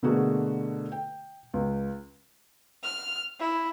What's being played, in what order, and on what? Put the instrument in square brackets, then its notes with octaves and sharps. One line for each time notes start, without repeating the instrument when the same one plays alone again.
[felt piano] B2 D3 A3 A#3 F#4 G#4
G5
C#2
[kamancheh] F6
E4